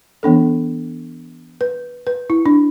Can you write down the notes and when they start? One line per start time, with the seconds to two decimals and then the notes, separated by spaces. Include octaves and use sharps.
0.23 E3 B3 D4 A4
1.61 B4
2.07 B4
2.30 E4
2.46 D4